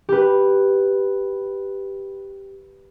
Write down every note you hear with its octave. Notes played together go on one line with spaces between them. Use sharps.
G4 B4